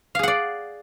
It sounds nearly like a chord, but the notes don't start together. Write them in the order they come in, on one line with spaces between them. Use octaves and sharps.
F5 G#4 F#5 D5